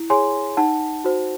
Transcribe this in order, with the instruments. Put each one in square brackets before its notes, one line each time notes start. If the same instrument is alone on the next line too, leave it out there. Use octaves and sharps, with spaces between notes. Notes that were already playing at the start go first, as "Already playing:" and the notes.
Already playing: [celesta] E4
G#4 C#5 G#5 C6
D#4 F#5 A5
F#4 C5